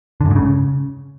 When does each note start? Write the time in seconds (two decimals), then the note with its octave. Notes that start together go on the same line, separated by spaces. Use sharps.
0.21 D3
0.26 F#2
0.31 G#2
0.36 C#3